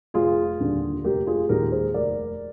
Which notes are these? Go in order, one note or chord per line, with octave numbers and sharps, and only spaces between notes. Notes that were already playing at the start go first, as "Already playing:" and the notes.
F1 F4 G#4
D#2 D3 G3
F1 G4 A#4
F4 G#4
D#2 D#3 G#3 G4 A#4
G#4 C5
F1 A#4 D5